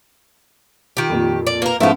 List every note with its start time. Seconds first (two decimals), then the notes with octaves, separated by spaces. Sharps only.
0.97 D#3 F4 G4
1.10 F2 A#2
1.47 D5
1.62 A#3 A#4 B4
1.80 G#2 F3 A3 B3 C#4 E4 F4